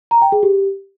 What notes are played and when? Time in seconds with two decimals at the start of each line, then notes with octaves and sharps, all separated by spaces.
0.11 A#5
0.22 G5
0.32 G#4
0.43 G4